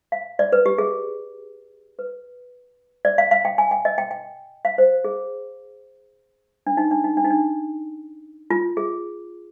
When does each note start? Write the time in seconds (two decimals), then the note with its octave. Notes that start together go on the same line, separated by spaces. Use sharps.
0.12 F5
0.39 D5
0.52 B4
0.66 G4
0.78 G#4
1.99 B4
3.05 D5
3.18 F5
3.31 F5
3.45 G5
3.58 G#5
3.71 G5
3.85 D#5
3.98 G5
4.11 G5
4.65 F5
4.78 C5
5.04 G#4
6.67 D4
6.77 D#4
6.91 D4
7.04 D#4
7.17 D4
7.25 D#4
7.30 D4
8.50 F4
8.77 G#4